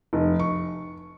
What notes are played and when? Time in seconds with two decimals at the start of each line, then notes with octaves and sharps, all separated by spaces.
0.13 F1
0.39 C#6